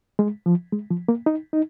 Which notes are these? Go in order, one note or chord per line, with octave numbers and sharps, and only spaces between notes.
G#3
F3
G#3
F3
A#3
D#4
D#4